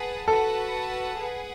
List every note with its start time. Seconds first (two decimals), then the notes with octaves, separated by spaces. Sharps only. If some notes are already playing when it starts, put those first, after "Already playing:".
Already playing: G#4 B4 F#5 A5
0.28 F#4 A4 B4 F#5 A5
1.19 G#4 B4 F#5